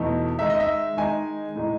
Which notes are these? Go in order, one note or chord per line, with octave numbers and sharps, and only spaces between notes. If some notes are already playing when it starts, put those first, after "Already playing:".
Already playing: E2 B2 A3 D#4
D#3 G#3 D#4 E5
D#5
E5
D#3 G#3 D#4 G#5
A2 G#3 D#4